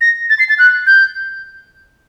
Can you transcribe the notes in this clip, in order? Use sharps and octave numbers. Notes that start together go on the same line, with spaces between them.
A#6
A6
C7
A6
F#6
G6